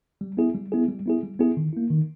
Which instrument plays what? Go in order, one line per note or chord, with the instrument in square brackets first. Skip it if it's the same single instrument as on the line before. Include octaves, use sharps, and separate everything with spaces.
[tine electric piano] G3
B3 E4 G#4
G3
B3 E4 G#4
G3
B3 E4 G#4
G3
B3 E4 G#4
D#3
A#3 E4
D#3